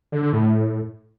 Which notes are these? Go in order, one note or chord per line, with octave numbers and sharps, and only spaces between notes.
D3
D3
A2